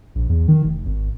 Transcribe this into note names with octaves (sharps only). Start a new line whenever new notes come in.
A#1
E2
D#3
F1
G#1